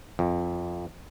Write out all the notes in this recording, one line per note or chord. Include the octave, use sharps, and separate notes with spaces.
F2